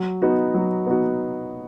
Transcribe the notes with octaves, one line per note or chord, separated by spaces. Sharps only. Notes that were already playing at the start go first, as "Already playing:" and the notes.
Already playing: F#3
B3 D#4 F#4
F#3
B3 D#4 F#4